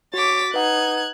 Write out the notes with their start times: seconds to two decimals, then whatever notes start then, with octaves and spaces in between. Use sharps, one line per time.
0.14 F#4 C#5 D6 A6 B6
0.54 D#4 B4 F#5 F#6 G#6